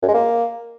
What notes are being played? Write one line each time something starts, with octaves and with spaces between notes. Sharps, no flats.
F#2
G#3
A#3